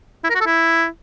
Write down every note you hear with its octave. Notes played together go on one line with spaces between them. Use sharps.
E4
A#4
F#4
A4
E4